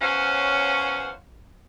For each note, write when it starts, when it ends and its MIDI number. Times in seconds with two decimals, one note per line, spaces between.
0.01 1.10 40
0.01 1.10 61
0.01 1.10 72
0.01 1.10 73
0.01 1.10 77
0.01 1.10 78